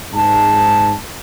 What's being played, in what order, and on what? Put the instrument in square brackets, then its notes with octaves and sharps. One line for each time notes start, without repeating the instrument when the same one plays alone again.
[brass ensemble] G#2 A5